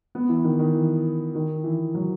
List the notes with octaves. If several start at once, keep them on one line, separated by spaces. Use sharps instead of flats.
B3
E3
D#3
D#3
E3
D#3
E3
F#3